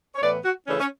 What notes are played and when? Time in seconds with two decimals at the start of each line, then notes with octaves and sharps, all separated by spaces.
0.15 C#5
0.21 A2 E3 B3 D5
0.44 F#4
0.67 C#3 E3 A3 C#4 D4
0.79 C#4